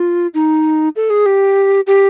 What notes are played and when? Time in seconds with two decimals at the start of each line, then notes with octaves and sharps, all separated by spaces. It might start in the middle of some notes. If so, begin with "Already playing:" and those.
Already playing: F4
0.34 D#4
0.96 A4
1.10 G#4
1.26 G4
1.87 G4